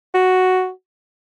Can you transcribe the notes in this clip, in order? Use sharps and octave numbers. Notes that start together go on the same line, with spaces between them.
F#4